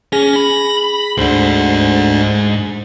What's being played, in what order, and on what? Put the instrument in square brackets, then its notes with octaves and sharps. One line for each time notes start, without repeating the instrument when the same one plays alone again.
[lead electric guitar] C#4 [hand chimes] G#4 [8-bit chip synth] A#6
[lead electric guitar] B5
[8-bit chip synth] D2 D3 [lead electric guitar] G#2 C5